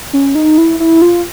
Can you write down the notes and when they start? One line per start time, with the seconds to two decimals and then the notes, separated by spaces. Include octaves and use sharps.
0.13 C#4
0.35 D#4
0.58 E4
0.80 E4
1.02 F4